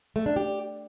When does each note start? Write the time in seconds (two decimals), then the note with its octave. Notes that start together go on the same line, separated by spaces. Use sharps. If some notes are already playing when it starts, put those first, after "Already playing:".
0.16 A3
0.26 D4
0.36 G4